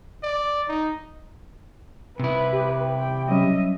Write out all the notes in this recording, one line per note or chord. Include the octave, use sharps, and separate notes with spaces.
D5
D#4
C3 E4 B4
G4
G5
F#3 G3 C#4 D#5 E5